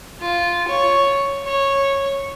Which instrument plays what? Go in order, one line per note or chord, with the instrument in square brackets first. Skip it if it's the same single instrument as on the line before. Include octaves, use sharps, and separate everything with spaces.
[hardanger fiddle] F4
C#5
C#5